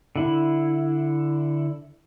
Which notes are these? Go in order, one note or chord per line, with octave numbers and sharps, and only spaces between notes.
D3 E4